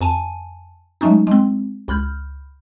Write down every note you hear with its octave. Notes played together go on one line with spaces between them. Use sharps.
F2 G#5 A5 D#7
F#3 G#3 A3 C#4 D#4
G#3 C4
C#2 B5 F6 G6